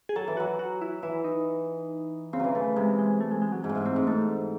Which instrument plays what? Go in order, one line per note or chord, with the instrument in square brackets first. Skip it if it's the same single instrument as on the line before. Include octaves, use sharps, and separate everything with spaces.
[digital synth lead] G#4
[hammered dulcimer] F#3 [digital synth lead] A4
[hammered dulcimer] E3
[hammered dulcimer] F#3 [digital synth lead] F#4
[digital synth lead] F#4
E4
[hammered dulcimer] E3 [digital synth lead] E4
[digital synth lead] D#4
[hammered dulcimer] C#3 [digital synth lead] C4
[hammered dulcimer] E3 F#3
[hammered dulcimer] E3 [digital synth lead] A3
[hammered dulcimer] C3 [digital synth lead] G#3
[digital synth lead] G#3
A3
G#3
G#3
F#3
[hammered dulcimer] G#2 [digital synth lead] G#3
[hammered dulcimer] A2
G#2
[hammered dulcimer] A2 [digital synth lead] C4
[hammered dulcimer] G#2
[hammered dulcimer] G#2 [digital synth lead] A3